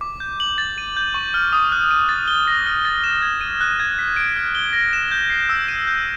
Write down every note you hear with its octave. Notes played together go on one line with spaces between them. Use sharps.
D6
G6
F#7
A6
D#7
G6
C#6
F6
D#6
F#6
D#7
A6
G7
A#6
F6
A6
E7
G#6
D#7
F#6
G#6
B6
D7
F6
G7
A#6
E7
G6
C7
E6
D#7
G6